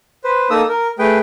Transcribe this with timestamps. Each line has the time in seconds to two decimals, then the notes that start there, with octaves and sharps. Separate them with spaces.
0.24 B4 C5
0.50 A#3 D#4 A4 D#6 E6
0.69 A#4
0.99 A3 G#4 B4 G5